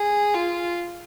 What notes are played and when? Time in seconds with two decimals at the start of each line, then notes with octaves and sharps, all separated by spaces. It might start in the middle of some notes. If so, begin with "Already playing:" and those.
Already playing: G#4
0.34 F4